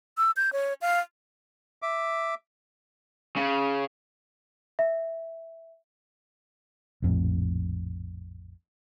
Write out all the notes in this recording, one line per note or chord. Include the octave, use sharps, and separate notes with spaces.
E6
G6
C#5
F5
E5 D6
C#3
E5
A#1 F2 A2